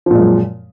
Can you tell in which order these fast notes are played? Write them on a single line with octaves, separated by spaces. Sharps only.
F3 A#2 G#3 F#2